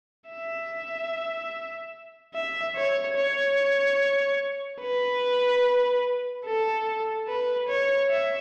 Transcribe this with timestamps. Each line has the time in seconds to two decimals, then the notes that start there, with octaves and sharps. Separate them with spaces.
0.29 E5
2.34 E5
2.76 C#5
3.17 C#5
4.81 B4
6.45 A4
7.28 B4
7.69 C#5
8.10 E5